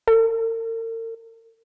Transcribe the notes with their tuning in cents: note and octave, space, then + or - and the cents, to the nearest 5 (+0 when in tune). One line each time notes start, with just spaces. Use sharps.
A#4 -45